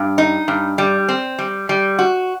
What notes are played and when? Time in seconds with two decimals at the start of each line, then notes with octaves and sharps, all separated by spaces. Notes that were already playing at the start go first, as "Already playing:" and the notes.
Already playing: G2
0.18 D#4
0.48 G2
0.78 G3
1.09 C4
1.39 G3
1.69 G3
1.99 F#4